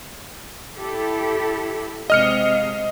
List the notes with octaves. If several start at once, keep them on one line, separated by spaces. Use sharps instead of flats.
E4 G4 A4
C3 G#3 D#5 F5 F6 C#7